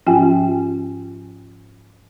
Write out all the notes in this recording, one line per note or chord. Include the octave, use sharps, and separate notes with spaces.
G#2 F3 C#4 F4 G5 G#5